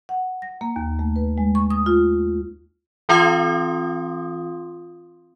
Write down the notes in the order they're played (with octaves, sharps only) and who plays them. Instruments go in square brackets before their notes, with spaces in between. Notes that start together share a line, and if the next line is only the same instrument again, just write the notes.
[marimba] F#5
A#6
A#3
D#2
A3
B4
G#3
C#6
D#6
F4
[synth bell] E3 C4 F4 F5 C6 D#6